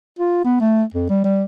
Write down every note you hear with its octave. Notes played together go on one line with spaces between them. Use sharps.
F4
B3
A3
F2
G3
G3